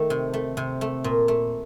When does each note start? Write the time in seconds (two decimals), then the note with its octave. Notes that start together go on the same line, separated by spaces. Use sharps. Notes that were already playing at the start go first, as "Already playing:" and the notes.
Already playing: D#3 A3
0.10 C3
0.34 A3
0.57 C3
0.81 A3
1.04 A#2
1.28 A3